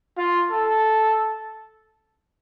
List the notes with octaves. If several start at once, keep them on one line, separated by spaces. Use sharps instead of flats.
F4
A4